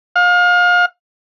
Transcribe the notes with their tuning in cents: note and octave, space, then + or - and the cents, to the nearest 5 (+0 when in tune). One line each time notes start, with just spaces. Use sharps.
F5 +30